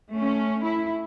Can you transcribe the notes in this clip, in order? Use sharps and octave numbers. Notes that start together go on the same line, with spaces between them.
A3 C#4
E4